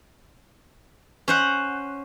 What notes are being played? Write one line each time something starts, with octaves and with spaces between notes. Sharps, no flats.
C#4 C5 F#5